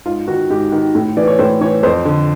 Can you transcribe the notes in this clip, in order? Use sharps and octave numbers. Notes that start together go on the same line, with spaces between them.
G#2 F4
D#3 F#4
G#2 G4
D#3
A2
E3 D5
C#5
A2 C5
E3 C#5
F2 C5
D3